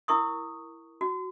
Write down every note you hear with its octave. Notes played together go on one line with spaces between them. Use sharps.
E4 A#4 C#6 D#6
F#4